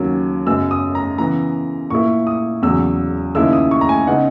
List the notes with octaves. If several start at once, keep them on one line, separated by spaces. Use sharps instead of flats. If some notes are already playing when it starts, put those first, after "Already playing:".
Already playing: D#2 C#3 F#3 C#4
F#2 C#3 G#3 B3 E6
D#6
A#5
C#3 E3 B3 A#5
A#2 A#3 E4 C#6
D#6
E2 C#3 F#3 E6
D#2 C#3 G#3 C#4 E4 E6
D#6
C#6
A#5
G#5
C#3 G#3 B3 D#4 F#5